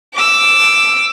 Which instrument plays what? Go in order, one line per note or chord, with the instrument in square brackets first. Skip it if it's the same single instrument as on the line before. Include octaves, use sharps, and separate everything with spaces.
[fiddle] D6 E6